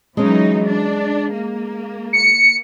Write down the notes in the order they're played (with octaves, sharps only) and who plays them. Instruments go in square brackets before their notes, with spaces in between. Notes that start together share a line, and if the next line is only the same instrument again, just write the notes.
[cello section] E3 F#3 D#4 [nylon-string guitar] G#3 C#4
[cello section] D4
A#3
[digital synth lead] C#7